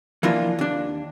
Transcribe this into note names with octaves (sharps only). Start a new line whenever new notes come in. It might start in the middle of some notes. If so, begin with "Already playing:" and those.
E3 F3 A#3 D4 F4
D#2 D4